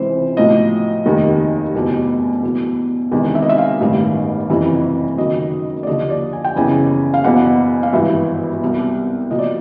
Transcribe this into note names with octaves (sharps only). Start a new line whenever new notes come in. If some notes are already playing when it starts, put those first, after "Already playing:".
Already playing: C#2 C3 E3 C5
B1 A2 F3 D#5
F1 D#2 D#3
F#1 E2 B2
E2 B2
E1 E2 C3 D#3
E5
D#5
E5
F5
A1 G2 D#3
F#1 F2 C3 E3
F#1 F#2 D#3 D#5
D5
D#2 D3 F3 D#5
D5
G#5
G5
F#1 E2 C#3 E3 G#5
F5
F#1 E2 B2 F#5
F5
G#1 G2 E3 E5
C2 B2
B1 A#2 F3 D#5
D5